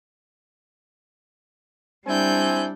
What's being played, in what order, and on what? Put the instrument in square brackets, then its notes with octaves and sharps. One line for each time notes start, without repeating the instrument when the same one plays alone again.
[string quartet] G3 D4 G6 [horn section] C4 E4 G#5